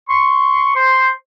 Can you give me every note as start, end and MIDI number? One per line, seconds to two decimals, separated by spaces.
0.10 0.72 84
0.10 0.72 85
0.76 1.09 72
0.76 1.09 84